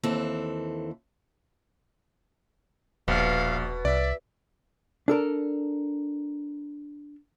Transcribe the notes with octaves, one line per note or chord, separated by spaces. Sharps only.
D#2 E3 C4 A4
D#1 A#1 B2 F5
C2 D5 E5
D4 A4 A#4